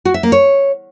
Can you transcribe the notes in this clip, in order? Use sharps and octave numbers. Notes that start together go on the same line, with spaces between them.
F#4
E5
A#3
C#5